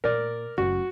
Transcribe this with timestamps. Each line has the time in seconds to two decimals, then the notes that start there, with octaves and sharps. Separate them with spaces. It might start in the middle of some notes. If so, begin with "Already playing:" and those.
0.04 A#2 A#4 D5
0.58 F#1 F#4